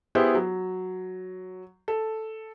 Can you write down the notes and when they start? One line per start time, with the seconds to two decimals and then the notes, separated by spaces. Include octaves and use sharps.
0.15 B3 E4 G4 G#4 C5
0.35 F#3
1.88 A4